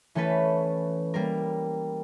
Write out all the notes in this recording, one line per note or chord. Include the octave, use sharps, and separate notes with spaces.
E3 A3 C#4 A4 B4
G3 A#3 A#4